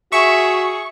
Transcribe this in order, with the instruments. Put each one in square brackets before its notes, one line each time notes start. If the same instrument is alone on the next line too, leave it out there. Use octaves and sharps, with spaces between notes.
[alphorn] F#4 [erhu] G#4 [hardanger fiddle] E5 [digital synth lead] C#6